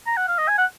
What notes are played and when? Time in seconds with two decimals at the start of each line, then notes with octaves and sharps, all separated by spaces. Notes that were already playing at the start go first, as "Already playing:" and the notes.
0.07 A#5
0.17 F#5
0.28 F5
0.38 D#5
0.48 G#5
0.58 F#5